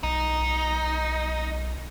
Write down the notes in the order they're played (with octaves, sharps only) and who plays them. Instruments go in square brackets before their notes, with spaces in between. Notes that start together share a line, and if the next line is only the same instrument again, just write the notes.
[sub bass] B1 [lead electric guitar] D#4